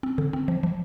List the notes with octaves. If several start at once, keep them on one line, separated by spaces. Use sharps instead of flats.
C4
D3
C4
F3
F3